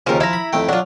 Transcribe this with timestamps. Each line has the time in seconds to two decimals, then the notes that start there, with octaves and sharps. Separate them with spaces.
0.07 D#2 C#3 F3 A#4
0.20 F3 E4 A#5
0.33 B5
0.53 F2 A3 G5
0.69 F#3 D4 F4